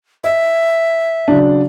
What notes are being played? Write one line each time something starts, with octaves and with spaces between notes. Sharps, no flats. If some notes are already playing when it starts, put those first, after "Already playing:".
D#5 E5
C#3 F#3 D4